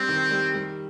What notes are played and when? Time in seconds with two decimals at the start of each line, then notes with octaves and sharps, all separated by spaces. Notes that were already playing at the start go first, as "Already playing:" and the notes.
Already playing: G3 C4 D4
0.09 D#3
0.31 G3
0.54 G3